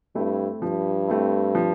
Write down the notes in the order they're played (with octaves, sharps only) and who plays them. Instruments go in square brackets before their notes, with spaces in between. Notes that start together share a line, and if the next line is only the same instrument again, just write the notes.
[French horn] G2 [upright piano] A3 C4 E4
[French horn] G2 [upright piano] F3
[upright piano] A3 C4 E4
F3